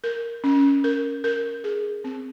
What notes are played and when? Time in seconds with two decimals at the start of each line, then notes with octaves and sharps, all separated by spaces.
0.04 A#4
0.44 C#4
0.84 A#4
1.24 A#4
1.64 G#4
2.04 C4